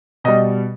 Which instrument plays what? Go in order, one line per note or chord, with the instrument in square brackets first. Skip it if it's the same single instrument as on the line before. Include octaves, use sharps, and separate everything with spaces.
[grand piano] B2 G3 D#5